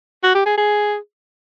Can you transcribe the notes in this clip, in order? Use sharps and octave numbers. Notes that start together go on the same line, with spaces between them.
F#4
G4
G#4
G#4